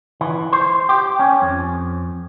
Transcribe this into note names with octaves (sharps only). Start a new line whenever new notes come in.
E3
C5
G4
C#4
F2